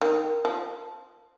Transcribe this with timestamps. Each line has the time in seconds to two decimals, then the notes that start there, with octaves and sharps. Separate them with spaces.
0.01 D#3
0.45 F3